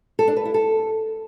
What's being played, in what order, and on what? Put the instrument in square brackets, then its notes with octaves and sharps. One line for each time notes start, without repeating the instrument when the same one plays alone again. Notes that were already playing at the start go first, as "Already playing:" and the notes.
[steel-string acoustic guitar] A4
D4
B4
E4
A4